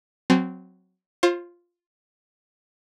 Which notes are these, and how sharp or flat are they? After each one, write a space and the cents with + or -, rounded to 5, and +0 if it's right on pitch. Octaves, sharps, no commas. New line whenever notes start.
F#3 +0 C4 -15 G#5 +25
F4 +0 C5 +35